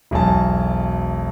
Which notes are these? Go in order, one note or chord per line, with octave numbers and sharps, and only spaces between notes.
E1 B1 G#5 A5